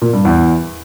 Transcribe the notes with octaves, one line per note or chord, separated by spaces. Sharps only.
A#2
G2
E2